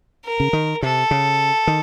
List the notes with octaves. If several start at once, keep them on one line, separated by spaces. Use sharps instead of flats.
A#4
C#3
D#3
C3 A4
C#3
D#3